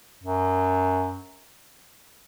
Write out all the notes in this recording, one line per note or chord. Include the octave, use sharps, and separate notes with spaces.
F#2